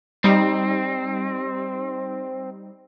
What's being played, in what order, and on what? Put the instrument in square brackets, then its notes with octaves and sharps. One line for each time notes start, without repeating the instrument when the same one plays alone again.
[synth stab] G3 D#4 [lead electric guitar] C4